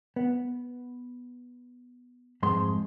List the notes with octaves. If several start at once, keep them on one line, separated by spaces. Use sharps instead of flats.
B3
F2 G#2 G#3 C6